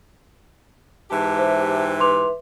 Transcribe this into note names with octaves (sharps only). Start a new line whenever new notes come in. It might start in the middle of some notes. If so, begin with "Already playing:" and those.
G#2 E3 G4 A5
C5 E5
B4 E5 C6 D6 F7